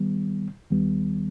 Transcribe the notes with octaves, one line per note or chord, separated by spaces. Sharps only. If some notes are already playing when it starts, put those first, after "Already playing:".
Already playing: D#3 G3 B3
D#2 D#3 G3 B3